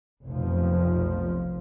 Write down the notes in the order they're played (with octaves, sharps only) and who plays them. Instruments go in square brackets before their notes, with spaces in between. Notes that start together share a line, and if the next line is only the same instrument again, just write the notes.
[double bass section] F1 B1 F3